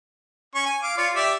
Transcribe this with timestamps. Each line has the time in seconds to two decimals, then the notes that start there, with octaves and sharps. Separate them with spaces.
0.55 C#4 C#6
0.66 G#5
0.83 F5 D6
0.97 F4 C#5 D5
1.15 G4 D5 E5